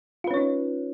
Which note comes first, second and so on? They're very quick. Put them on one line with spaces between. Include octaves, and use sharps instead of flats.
F4 B4 C#4 C#5 D#4